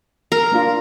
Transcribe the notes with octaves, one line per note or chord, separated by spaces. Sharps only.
A#4
A#3 D4 F4